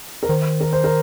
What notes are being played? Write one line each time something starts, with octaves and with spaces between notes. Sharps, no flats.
A#4
D#3 C5
A#4
C5
A#4